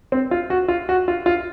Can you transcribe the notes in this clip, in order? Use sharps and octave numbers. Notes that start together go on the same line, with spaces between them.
C4
F4
F#4
F4
F#4
F4
F4